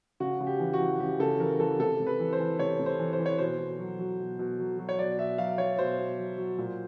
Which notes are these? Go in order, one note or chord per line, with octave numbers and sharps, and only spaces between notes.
C#3 F#4
C#3
G4
E3
F#4
E3
C#3 G4
C#3 A4
E3 A#4
E3 A4
C3 A4
C3
B4
E3
C5
E3
C3 C#5
C3
C5
E3
C5
E3
C#5
B2 C5
B2
F#3
F#3
B2
B2
F#3
F#3
C#5
B2 D5
B2 E5
F#3 F5
F#3 C#5
B2 C5
B2
F#3
F#3
A#2